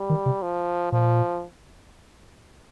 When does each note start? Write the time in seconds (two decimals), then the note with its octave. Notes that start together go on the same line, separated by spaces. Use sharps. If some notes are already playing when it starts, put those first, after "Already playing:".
Already playing: G3
0.10 D#3
0.26 C3
0.42 F3
0.92 A#2 F3